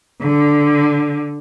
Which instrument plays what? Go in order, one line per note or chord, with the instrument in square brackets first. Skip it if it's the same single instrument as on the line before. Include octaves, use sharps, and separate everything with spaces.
[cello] D3